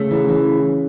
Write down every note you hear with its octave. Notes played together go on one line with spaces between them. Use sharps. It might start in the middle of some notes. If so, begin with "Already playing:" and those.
Already playing: C#3 A3
E3
E3